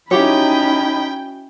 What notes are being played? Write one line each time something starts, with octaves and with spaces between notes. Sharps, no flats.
C#4 D#4 E4 F#4 G4 C#5 G5 B5